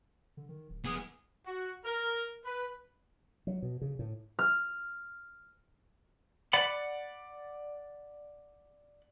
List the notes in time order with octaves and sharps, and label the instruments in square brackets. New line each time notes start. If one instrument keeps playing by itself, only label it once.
[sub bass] D3
D#3
D1
[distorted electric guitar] B3 G#4
[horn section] F#4
A#4
B4
[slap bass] F#3
B2
C#3
A2
[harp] F6
[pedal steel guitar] D5 F#5 B5